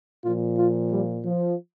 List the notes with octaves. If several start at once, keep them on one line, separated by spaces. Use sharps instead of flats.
A#2 F3 F4
F4
G3
F3